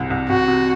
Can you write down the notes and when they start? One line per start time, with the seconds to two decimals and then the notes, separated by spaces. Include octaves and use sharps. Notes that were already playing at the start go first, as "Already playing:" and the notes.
Already playing: C2 C3
0.10 C2
0.29 C2 F#4
0.48 C3